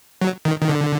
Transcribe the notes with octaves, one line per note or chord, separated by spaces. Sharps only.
F#3
D#3
D#3
D3